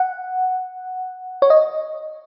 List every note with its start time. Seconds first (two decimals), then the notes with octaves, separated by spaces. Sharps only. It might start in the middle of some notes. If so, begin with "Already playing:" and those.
Already playing: F#5
1.42 C#5
1.50 D#5